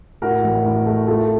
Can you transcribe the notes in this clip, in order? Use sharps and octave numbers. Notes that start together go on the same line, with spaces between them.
A2 F#4 A#4
A1
A2
A3
A3 F4 A4